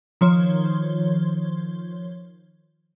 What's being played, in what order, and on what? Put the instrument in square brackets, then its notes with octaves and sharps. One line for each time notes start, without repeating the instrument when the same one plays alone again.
[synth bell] D#3 F3 C#5 C6